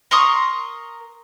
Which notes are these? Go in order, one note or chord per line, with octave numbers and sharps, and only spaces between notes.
A#4 C6 C#6 D#6